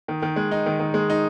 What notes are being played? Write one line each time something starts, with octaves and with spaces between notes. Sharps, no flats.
D#3
D#3
G#3
D#4
D#3
D#3
G#3
D#4